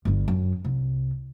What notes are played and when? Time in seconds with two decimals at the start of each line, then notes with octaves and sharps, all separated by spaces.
0.05 G1 G2
0.28 F#2
0.64 C2